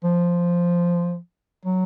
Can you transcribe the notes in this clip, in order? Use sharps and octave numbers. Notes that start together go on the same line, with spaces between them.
F3
F#3